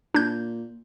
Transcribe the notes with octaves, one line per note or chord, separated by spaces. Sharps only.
A#2 D4 G6